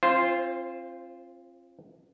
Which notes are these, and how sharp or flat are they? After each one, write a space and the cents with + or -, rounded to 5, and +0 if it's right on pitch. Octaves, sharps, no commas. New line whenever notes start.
C4 +35 F4 -15 C5 +0